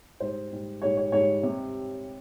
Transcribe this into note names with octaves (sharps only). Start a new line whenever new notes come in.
G#2 G3 C5
G#2 G3
G#2 G3 C#5
C#5
G#2 G3 C#5
C3 G3